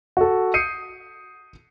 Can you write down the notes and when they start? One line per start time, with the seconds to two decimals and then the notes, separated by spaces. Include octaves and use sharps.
0.17 F#4 A4
0.54 D#6 G6 C7 C#7 D#7